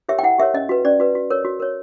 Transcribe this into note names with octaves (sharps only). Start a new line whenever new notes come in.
G4 A#4 C#5 E5
G5
E4 F#5
G4 A#4 C#5 E5
C#4 D#5
F#4 B4
C#4 D5
F#4 B4
F#4
A#4 C#5
F#4
A#4 C#5